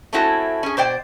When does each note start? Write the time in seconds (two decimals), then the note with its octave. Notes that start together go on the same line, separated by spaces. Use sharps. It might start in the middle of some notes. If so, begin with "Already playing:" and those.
0.13 A3 C4 C#4 E4 F#4 A4
0.63 C#4 G#4
0.77 B2 C5 D5 G5